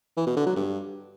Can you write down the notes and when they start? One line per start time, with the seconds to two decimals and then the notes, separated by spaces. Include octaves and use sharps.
0.17 E3
0.27 B2
0.36 D3
0.46 F#3
0.56 G2